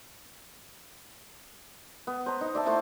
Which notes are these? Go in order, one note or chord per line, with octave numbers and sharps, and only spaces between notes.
B3
C5 A#5
D#4
D5 E5 A5
A3 E4 C5 F#5